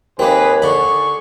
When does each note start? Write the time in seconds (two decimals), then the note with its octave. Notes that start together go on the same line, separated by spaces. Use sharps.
0.19 D#2 A#3 C4 G#4 B4
0.62 D3 G#4 D5 B5 C#6